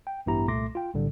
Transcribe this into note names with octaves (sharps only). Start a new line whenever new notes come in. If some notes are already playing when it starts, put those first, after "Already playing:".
G5
A1 G2 B3 E4 G4 A#5
C2 A#2 A3 C6 D6 A#6
F4 G5
B1 A2 D3 G3